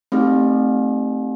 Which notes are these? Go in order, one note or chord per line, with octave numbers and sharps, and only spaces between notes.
A3 C4 D#4 G4